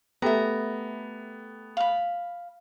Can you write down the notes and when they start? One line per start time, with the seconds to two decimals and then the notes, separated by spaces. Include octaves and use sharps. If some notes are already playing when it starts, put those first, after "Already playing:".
0.22 A3 B3 G4 E5 A#5
1.77 F5 B5